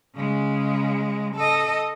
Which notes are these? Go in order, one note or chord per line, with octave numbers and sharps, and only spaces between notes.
C#3 G#3
A4 D#5